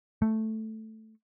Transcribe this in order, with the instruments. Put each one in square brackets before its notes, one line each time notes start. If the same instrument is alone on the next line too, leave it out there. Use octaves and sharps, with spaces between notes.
[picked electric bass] A3